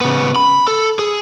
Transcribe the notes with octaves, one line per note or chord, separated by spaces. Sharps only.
C#3 B3
B5
A4
G#4